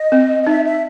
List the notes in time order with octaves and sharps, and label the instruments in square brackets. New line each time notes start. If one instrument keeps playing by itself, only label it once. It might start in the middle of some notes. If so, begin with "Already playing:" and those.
Already playing: [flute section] D#5
[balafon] C4
[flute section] D#5
[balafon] D#4 [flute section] E5
[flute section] E5